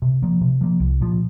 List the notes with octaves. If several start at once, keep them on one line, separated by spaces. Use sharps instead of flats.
C3
F3 A#3
C3
F3 A#3
C2
A#2 F3